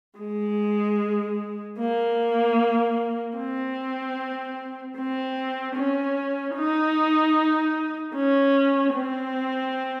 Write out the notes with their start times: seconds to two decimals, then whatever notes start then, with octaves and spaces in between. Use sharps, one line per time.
0.19 G#3
1.79 A#3
3.37 C4
4.97 C4
5.76 C#4
6.55 D#4
8.15 C#4
8.94 C4